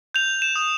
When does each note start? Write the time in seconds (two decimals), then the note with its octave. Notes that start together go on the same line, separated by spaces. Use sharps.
0.14 G6 F7
0.42 E7
0.56 D#6